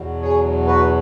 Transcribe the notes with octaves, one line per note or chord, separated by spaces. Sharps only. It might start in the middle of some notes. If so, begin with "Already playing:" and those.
Already playing: E2 B2 F#3
G#4 C#5
F#4 B4